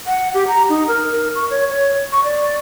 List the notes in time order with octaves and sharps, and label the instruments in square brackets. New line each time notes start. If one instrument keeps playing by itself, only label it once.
[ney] F#5
G4
A#5
D#4
A#4
A#4
C#6
C#5
C#5
C#6
D5